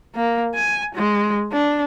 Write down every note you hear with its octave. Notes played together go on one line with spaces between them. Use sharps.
A#3
G#5
G#3
D4